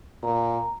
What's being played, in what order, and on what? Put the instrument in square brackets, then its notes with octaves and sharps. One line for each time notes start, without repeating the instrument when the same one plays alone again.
[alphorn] A#2 [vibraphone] A#5